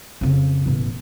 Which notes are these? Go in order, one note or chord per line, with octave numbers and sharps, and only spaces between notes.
F2 C#3
E1 A1